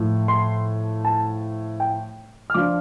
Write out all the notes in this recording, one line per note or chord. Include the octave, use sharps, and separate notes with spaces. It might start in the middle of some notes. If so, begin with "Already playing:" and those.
Already playing: A2 F3 A3
C6
A5
G5
F6
F3 D4 F4 D6